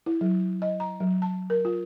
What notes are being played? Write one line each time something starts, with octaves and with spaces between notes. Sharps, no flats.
E4
F#3
D#5
A#5
F#3
A5
A#4
F4